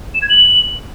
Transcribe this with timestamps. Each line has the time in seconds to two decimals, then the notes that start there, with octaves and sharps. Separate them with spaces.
0.14 E7
0.22 G#6
0.30 F#7